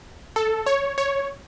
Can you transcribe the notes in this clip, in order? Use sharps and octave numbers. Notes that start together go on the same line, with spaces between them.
A4
C#5
C#5